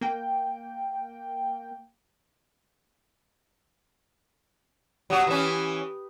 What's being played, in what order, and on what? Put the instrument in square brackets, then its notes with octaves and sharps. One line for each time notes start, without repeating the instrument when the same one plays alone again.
[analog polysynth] A#3 G5
[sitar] F#3 F#4 [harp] G4 D#6 G6
[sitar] E3 C#4 [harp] B4